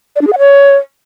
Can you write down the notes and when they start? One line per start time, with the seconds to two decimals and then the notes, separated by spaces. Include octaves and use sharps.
0.16 D5
0.21 D4
0.27 G#4
0.33 F#5
0.39 C#5